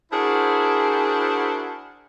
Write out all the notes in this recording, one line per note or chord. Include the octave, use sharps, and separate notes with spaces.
D4 E4 F#4 G#4 A#4 C5